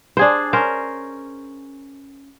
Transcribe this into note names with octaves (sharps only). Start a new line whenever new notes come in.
D4 G#4 C5
C#4 A#4 C5